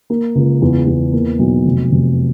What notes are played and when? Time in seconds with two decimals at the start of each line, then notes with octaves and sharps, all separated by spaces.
0.10 A#3
0.35 C#2
0.62 E2
0.87 E2
1.13 A#3
1.39 B1
1.65 F1
1.91 F1